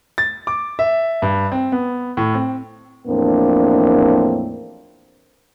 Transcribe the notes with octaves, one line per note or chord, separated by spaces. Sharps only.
A6
D6
E5
G2
C4
B3
A2
C4
E2 A2 F3 A#3 C4 D4